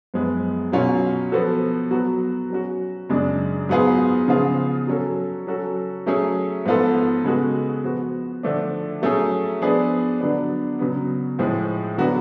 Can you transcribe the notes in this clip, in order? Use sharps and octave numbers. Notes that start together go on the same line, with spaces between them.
F#2 F3 G#3 B3
B2 F#3 C#4 F4
F3 B3 F#4 A4
F#3 B3 F#4
F#3 C#4 F#4
F#2 C#3 G#3 D4
G#2 F#3 B3 F4 G#4
C#3 F3 B3 F4 G#4
F#3 C#4 F#4 A4
F#3 C#4 F#4 A4
F#3 A3 C#4 G#4
G#2 F3 B3 F4 A4
C#3 G#3 B3 F#4 A4
F3 B3 F#4
D3 F3 A3 D4
F#3 A3 C#4 G#4
F3 B3 D4 G#4
D3 F#3 B3 D4
C#3 F#3 B3
A2 F3 G#3
D3 F#3 B3 F#4